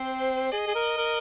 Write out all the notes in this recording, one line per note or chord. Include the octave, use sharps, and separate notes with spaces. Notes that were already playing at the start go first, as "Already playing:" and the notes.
Already playing: C4 C5
G#4 D#5
G#4
A#4
A#4